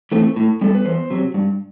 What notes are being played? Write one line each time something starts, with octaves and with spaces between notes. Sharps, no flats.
E3 A3 C4
A2
G3 B3 A4
B4
E2 C5
C3 F#3
G2